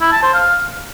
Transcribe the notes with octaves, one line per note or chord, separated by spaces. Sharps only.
E4
A5
C5
F5